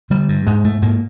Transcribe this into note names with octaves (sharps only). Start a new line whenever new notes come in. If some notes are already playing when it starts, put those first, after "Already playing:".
D3 G3
G2
G#2 G#3
G#2 A3
G#2 A#3